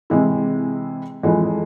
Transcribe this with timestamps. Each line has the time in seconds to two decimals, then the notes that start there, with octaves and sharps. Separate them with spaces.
0.10 C3 E3 G#3 E4
1.23 F2 E3 G#3